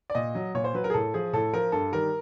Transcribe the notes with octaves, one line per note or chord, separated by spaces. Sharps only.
D5
A#2 D#5
F#3
A#2 C#5
C5
F#3 B4
A#4
G#4
A2 A4
F3 G#4
A2 A4
F3 A#4
G2 A4
D#3 G3 A#4